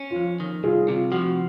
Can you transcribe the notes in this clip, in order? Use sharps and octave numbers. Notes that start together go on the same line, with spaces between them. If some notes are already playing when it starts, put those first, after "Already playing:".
Already playing: C#4
F4
F2
D#3
C2 F4 G#4
C3 F4
F3 F#4